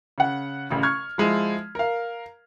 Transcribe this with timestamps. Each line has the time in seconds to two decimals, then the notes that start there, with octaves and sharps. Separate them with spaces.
0.18 C#3 F#5
0.70 A1 C#3
0.83 C#6 F6 G#6
1.18 F3 G#3 E4
1.75 A#4 F5